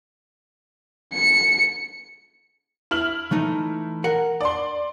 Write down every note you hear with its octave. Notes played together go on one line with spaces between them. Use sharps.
C#7
E4 F6 F#7
E3 A3 D#4
A#4 F#5
D5 C6